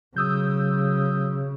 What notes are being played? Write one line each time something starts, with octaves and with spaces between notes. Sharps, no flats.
C#3 F#3 D#6 E6 G6